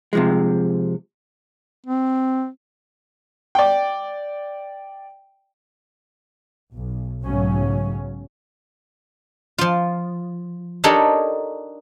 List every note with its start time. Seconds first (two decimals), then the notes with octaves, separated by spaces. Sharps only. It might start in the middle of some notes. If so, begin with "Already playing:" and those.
0.13 C3 F3 G#3
1.86 C4
3.55 D5 G5
6.73 B1
7.24 B1 G#2 C#3 F#3 A3 C#4
9.58 F3 F4
10.84 D4 D#4 G4 A4 A#4 C#5